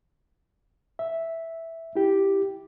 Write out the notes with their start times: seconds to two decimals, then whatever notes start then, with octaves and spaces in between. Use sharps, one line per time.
0.99 E5
1.96 E4 G4